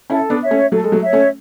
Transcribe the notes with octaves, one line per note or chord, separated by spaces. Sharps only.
C#4 E4 A4
B3 D4
C#5 E5
A3 C#4
F#3 A3 A4
G#3
F#3 A3
C#5 E5
A3 C#4